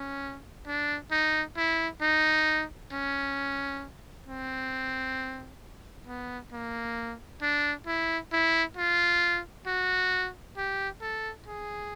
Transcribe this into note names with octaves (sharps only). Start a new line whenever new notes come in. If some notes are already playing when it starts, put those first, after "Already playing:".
Already playing: C#4
D4
D#4
E4
D#4
C#4
C4
B3
A#3
D4
E4
E4
F4
F#4
G4
A4
G#4